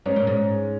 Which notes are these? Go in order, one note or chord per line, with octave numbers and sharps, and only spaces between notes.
G#2 C#4
A#2
G#2